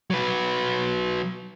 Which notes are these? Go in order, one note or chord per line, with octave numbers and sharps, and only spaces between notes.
F#3 B4